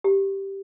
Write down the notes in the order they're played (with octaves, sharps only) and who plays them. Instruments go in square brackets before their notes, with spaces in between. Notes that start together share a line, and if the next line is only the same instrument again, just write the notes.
[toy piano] G4